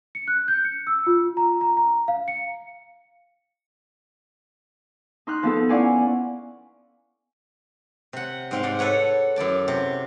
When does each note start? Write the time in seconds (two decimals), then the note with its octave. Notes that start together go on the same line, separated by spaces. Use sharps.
0.15 C#7
0.28 F#6
0.48 G6
0.65 C#7
0.87 E6
1.07 F4
1.37 A#5
1.61 A#5
1.77 A#5
2.08 F5
2.28 C#7
5.27 D#4 C6 F6 F#6
5.43 F3 B3 A4
5.69 C#4 E4 D5 F5 F#5 G#5
8.13 C3 F#5
8.51 G#2 C4 F5
8.63 G#2 D5 F#5
8.79 A4 B4 C#5 F#5
9.36 F#2 E4 D5 A5
9.68 C3